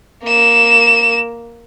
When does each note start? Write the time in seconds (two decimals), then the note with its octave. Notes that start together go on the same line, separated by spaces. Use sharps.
0.24 A#3 E7